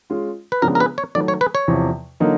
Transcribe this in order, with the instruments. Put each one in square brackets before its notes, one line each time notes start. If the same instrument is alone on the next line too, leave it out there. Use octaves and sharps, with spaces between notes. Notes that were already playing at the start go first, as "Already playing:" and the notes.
[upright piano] G#3 C#4 F4
[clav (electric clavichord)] B4
[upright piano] C#3 F3 G#3 B3 D4 [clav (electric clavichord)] A#4
[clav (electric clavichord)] A#4
B4
C#5
[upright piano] D#3 F#3 A3 [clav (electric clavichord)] D5
[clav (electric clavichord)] C#5
B4
C#5
[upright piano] E2 C3 F3
D3 F#3 A#3 D#4